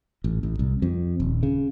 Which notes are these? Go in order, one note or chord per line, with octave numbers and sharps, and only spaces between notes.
A1
A1
C2
F2
D#1
C#3